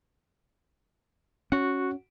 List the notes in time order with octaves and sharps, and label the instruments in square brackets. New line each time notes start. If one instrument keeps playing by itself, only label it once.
[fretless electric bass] C#4 [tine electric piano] F#4 F#5